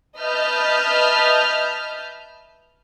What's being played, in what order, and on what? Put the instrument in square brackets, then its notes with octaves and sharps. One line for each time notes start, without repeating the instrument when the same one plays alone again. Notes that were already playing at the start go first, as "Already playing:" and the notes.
[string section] B4 D#5 E5 A5 F6 G6